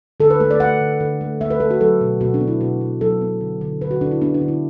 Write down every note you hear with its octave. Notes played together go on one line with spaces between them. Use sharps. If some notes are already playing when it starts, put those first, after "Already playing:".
D3 A4
B4
A3 A4
D5
A3 F#5
D3
D3
A3
A3 E5
B4
A3 A4
F#4
F#3 A4
B2
B2 F#4
D4
B3
E4
B2 F#4
B2
F#3 A4
B3
D3
D3
D3 B4
F#4
D3 D4
E4
B3 D4
D4
D3
E4